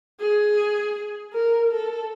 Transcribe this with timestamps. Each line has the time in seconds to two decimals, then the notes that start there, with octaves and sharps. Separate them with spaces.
0.20 G#4
1.33 A#4
1.71 A4